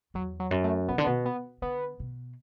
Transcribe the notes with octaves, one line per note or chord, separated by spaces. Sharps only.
E2 F#3
F#3
F#2
A3
B2 B3
D3
B3
B2
B3
D3 B3
B2